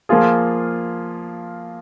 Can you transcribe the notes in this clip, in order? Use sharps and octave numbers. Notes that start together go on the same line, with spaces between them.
F3 A#3 F4 G#4